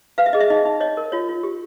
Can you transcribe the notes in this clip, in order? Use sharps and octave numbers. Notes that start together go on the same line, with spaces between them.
B4 F5
E5
G#4 D#5
E5
D#4 D#5
D#4
C#5 D#5
A#4
F4 C#5
F4
G4